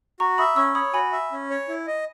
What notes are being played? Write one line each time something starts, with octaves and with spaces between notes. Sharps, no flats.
F#4 A#5 C#6
E5 B5 D#6
C#4 C#6 E6
C#5 B5 D#6
F#4 G#5 B5
E5
C#4
C#5
E4
D#5